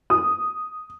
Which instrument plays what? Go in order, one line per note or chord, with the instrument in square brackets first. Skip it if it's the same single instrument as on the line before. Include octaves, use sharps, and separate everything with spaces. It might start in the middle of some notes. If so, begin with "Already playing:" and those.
[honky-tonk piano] D#6